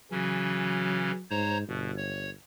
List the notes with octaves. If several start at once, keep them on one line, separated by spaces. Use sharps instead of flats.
C#3 E3 F#3 C#4
G#2 C5 C#5 A#5
G1 B2
C#5